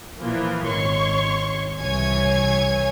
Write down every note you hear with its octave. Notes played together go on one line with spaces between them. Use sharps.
A#2 E3 F3 A#3
G#1 C#5 C6 C#6
C2 E3 C#5 G#5 C#6 G#6